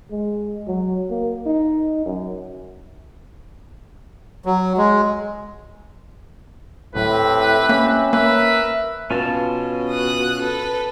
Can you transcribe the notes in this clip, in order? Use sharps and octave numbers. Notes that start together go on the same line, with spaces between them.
G#3
F#3
A#3
D#4
F#2
F#3
G#3
D#1 A2 C4 G4 B4 E5
A#3 C#4
A#3 A#4 B4 E5
B2 C#4 F4 A5
D#6 F#6
A4 B4